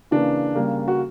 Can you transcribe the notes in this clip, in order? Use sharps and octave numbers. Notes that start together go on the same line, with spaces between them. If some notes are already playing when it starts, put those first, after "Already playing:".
C#3 E3 A#3 D4
C#3 G3 A#3
F#4